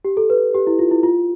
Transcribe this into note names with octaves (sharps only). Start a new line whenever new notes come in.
G4
A4
B4
G4
E4
F4
E4
F4